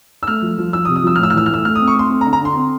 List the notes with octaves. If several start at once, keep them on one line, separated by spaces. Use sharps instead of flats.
E6
A3 F6
F3
F3
F3 E6
D#6
C3
D#6
F3 E6
F6
A2 E6
F6
E3 E6
F6
A3 E6
A3 F6
D#6
C4
C#6
A3 C6
C4
A#5
D3
A#5
D3 C6
C4